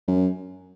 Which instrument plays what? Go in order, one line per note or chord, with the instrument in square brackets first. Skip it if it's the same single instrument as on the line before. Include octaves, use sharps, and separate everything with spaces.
[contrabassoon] F#2